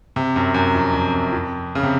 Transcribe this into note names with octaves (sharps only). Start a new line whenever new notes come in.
C3
F#2
F#2
F2
F2
F#2
F2
C#3
C3